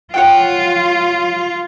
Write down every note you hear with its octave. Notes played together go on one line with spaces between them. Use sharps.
F4 C#5 F#5 G5